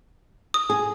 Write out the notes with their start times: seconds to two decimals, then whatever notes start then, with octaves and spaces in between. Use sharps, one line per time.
0.54 D#6
0.70 G#4